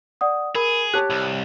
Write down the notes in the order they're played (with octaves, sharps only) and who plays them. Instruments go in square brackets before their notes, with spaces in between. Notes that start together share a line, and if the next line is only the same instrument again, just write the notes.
[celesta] D5 F#5 D#6
[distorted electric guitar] G#4 [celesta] A#4 B5
[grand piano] G4 C#5 A5 [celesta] F#6
[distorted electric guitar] C2